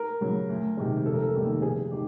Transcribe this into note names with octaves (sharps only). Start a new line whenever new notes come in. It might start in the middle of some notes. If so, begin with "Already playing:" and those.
Already playing: A#4
C#3 F#3
D2
C3 D#3 G#3
F1 A4
A#4
A4
D#2 D#3 G3
F1 G#4
D#3 G4